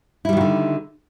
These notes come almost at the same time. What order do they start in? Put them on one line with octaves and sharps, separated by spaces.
E4 G3 D#3 F#3 D3